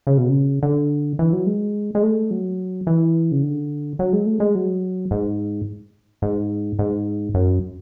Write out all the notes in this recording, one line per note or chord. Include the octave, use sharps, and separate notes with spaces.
C#3
B2
C#3
D3
E3
F#3
G#3
G#3
A3
F#3
E3
C#3
D3
F#3
G#3
A3
G#3
F#3
G#2
G#2
G#2
F#2